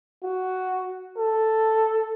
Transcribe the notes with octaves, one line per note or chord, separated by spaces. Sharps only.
F#4
A4